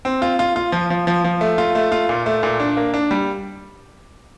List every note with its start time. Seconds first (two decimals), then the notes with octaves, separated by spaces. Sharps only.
0.05 C4
0.22 F4
0.39 F4
0.56 F4
0.72 F3
0.90 F3
1.07 F3
1.24 F3
1.41 A3
1.58 F4
1.75 A3
1.92 F4
2.09 A#2
2.26 A3
2.43 A#2
2.60 D4
2.77 A#3
2.94 D4
3.11 G3